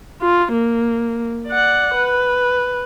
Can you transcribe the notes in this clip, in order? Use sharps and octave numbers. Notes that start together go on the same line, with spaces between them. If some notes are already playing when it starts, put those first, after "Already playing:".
F4
A#3
D5 F#5
B4